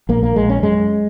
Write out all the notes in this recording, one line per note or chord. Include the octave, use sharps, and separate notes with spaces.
A#1 A#3
A#3
A#1 G#3
C#4
F#2 G#3